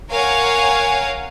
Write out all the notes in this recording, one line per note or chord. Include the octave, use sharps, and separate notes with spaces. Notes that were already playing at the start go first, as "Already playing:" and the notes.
A#4 C#5 F5 F#5 G#5